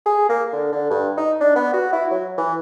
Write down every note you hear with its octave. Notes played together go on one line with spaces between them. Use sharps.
G#4
A#3
D3
D3
G2
D#4
D4
B3
F#4
E4
F#3
E3